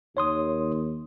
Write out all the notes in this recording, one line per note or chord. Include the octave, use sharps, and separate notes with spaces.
D#2 C#5 C6 D#6